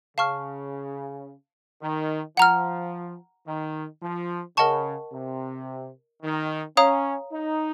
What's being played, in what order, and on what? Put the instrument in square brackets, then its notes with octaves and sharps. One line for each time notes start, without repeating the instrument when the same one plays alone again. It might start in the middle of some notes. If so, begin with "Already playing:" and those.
[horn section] C#3 [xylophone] F5 A5 C#6 F6
[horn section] D#3
[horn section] F3 [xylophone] F#5 A#5 F6
[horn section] D#3
F3
[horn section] C#3 [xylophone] A#4 D#5 F#5 A5 C#6
[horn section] C3
D#3
[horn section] C#4 [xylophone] C#5 F5 A#5 D#6
[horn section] D#4